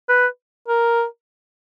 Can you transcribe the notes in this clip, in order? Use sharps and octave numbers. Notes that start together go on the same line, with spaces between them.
B4
A#4